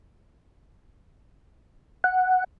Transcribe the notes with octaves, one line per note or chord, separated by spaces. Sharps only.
F#5